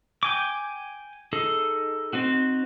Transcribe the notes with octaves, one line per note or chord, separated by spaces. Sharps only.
G5 G#5 D6
D#4 G#4 A4
C4 D#4 F#4